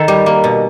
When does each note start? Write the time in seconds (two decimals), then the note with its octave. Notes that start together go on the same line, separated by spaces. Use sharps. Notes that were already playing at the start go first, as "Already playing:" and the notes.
Already playing: D#3 A4
0.08 G3
0.26 A#3
0.44 B2